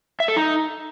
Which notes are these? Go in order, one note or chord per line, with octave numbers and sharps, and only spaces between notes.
E5
A4
D#4